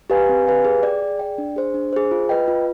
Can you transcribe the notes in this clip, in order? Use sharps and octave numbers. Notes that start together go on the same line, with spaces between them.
G4 B4 F5 G#5
C4
G4 B4 F5 G#5
G#4
D5 G5
G#4
D5 G5
D4
G#4 C5
D4
G#4 C5
F4
B4 D#5 G5
F4